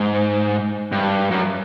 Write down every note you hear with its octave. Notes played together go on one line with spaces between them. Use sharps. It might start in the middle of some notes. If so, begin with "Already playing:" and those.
Already playing: G#2
G2
F#2